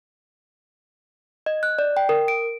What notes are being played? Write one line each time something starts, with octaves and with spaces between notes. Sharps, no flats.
D#5
F#6
D5
G5
A#4
D7